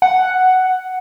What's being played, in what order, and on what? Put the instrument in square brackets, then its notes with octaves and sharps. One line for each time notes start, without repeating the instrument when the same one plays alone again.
[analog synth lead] F#5